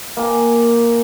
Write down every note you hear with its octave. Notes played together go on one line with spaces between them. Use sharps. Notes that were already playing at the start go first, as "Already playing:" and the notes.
A#3 G#5